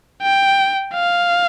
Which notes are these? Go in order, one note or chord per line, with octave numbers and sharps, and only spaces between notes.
G5
F5